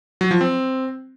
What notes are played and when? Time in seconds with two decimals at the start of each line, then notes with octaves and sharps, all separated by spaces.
0.21 F#3
0.31 F3
0.41 C4